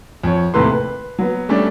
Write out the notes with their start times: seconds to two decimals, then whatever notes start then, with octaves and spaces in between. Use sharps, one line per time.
0.24 F2 C#5
0.54 D#2 A2 C3 A3 B4 C6
0.73 B4
1.19 F#3 B3
1.49 G3 A3 C#4 D4